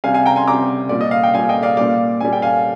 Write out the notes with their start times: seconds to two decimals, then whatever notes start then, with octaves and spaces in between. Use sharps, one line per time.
0.04 C3 G3 F5 G#5
0.14 F5 G#5
0.26 G5 A#5
0.36 G#5 C6
0.47 C3 G3 A#5 D6
0.89 A#2 G3 D5
1.01 D#5
1.11 F5
1.23 G5
1.34 A#2 G3 F5 G#5
1.49 D#5 G5
1.63 D5 F5
1.77 A#2 G3 D5 F5
2.21 A#2 G3 G#5
2.33 G5
2.42 F5 G#5